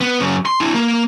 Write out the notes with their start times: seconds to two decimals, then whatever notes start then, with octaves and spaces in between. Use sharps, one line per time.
0.01 B3
0.20 F#2 C#3
0.46 C6
0.60 D4 E4
0.75 A#3